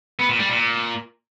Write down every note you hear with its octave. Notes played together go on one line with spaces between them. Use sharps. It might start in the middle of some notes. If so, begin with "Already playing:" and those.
B3
A#2
G3
A#2